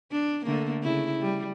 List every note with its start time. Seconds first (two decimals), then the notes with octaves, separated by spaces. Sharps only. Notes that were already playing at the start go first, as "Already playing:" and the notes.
0.12 D4
0.46 D3 A3 A#3
0.83 C#3 E4
1.21 G3